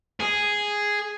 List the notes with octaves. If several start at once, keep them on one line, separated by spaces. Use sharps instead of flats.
G#4